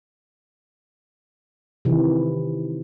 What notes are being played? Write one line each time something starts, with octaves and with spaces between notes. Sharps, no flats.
C3 D#3 E3